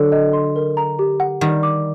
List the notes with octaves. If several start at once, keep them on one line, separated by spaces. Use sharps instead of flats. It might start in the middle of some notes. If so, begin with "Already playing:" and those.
Already playing: D3 F#3
D#5
C6
A#4
A#5
G4
F#5
D#3 G3 F#5
D6